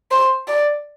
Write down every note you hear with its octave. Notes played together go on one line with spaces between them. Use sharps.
C5
D5